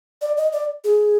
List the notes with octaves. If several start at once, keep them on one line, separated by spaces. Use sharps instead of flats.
D5
D#5
D5
G#4